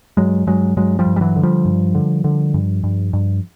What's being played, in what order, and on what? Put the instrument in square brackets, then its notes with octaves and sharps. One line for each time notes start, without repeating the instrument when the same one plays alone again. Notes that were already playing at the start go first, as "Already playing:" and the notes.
[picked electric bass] G2 F#3 G#3
G2 F#3 G#3
G2 F#3 G#3
F3 G3
G2
G3
E3 F#3
D3
F3 G3
G2
D3
D3
G2
G2
G2